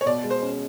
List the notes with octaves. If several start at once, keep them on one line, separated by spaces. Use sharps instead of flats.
C#5
B2 D5
G#3
C5
C#4